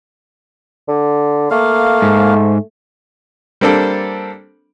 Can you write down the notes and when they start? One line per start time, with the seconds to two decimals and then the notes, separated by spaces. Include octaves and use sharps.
0.88 D3
1.51 A3 A#3 F5
2.02 G#2
3.61 G3 A#3 C4 D4 A4